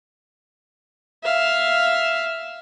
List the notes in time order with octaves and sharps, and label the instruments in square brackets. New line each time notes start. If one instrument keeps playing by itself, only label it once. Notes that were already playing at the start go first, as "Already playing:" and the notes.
[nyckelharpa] E5 F5